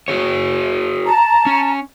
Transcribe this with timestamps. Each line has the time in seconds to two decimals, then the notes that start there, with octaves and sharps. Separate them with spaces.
0.08 F#4 G#4 C#5
1.05 A5 A#5
1.46 C#4